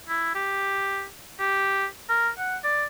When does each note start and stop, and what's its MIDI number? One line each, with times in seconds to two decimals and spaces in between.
0.09 0.32 64
0.35 1.05 67
1.39 1.86 67
2.09 2.29 70
2.38 2.57 78
2.64 2.85 74